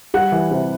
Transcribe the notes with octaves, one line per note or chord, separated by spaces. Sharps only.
G3 F#5
E3
C3